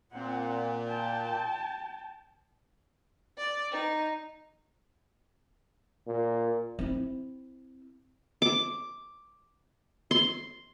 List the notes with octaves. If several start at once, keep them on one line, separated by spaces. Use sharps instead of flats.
A#2 C4 F#5
G5 A5
D5
D#4
A#2
C4 E4
D6
C6